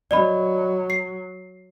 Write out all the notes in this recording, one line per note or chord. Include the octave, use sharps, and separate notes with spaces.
F#3 D5 D#5 B5
C7